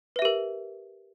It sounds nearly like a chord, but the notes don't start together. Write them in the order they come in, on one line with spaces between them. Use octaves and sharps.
B4 E5 G4 A#4